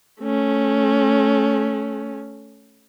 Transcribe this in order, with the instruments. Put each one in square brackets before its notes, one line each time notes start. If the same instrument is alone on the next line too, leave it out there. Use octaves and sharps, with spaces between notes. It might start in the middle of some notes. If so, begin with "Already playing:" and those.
[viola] A3 C#4